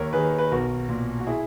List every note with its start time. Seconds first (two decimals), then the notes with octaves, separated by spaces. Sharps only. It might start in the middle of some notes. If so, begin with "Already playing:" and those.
Already playing: D#2 A#4 C#5
0.13 D#3 G#4 B4
0.38 B4
0.51 B1 F#4 A#4
0.89 A#2
1.20 F#4
1.27 E4 G#4